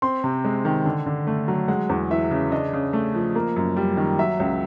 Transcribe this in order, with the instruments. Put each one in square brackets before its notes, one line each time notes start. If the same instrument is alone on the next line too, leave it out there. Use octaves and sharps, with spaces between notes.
[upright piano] C4 C6
C3
G#3
D#3
D3
D3
A3
F#3
G#3 F#5
E2
E3 E5
C#3
D4 D#5
C#3
A3
F3
A#3
F#2
G3
D#3
F#3 E5
C#2